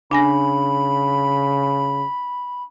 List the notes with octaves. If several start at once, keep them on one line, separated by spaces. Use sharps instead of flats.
C#3 D4 G#5 B5 A#6